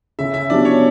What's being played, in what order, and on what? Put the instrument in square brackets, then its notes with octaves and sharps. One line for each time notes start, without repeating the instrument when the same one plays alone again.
[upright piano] C#3 [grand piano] E5
[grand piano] E5
[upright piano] F#3 B3 D4 G4 [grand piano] D5
[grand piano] C#5